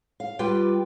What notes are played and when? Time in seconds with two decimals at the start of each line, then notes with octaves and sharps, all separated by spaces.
0.20 F5
0.39 G3 F4 G4 B4 G5